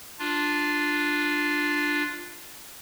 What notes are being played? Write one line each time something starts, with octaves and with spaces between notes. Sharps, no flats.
D4 F4